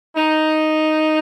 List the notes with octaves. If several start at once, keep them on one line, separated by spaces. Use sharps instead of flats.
D#4